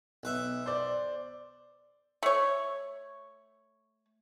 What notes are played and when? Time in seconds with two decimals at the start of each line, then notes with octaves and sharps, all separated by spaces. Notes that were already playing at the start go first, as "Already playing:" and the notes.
0.23 B1 B4 E5
0.66 C5 D5
2.23 A3 C#5